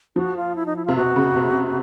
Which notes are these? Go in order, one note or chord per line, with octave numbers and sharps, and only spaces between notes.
F3 F#4
F4
E4
D#4
E4
C3 F4
B2 F#4
C#3
C3